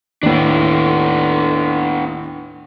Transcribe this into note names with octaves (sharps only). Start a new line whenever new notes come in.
D#2 A2 B3 D4